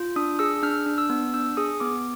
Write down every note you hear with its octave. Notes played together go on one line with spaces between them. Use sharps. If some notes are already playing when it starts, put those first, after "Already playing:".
Already playing: F4
D4 D#6
G#4 E6
D4 F6
D4
E6
B3
D4 E6
G#4 D#6
B3 D6